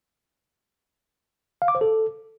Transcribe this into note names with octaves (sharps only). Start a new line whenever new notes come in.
F5
D6
C5
A4